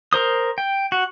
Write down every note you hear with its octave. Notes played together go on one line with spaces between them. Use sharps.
A#4 C5 D#6
G5
F#4